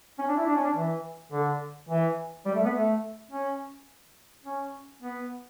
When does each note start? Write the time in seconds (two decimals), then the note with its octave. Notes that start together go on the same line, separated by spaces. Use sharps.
0.19 C#4
0.28 D4
0.36 E4
0.46 D4
0.55 C#4
0.64 D4
0.75 E3
1.32 D3
1.89 E3
2.46 G3
2.55 A3
2.64 B3
2.74 A3
3.31 C#4
4.44 C#4
5.02 B3